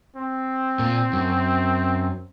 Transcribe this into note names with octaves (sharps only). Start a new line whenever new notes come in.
C4
A#2
F#2